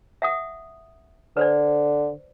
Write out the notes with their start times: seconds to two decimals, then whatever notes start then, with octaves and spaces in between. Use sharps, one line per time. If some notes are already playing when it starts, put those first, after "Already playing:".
0.22 E5 F#5 D#6
1.37 D3 B4 C5 D5